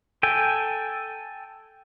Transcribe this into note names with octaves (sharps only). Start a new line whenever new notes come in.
A4 G5 G#5